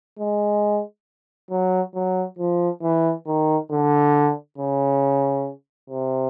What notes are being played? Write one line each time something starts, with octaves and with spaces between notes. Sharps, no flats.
G#3
F#3
F#3
F3
E3
D#3
D3
C#3
C3